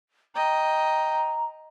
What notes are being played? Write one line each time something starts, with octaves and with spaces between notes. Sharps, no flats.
D#5 G5 A#5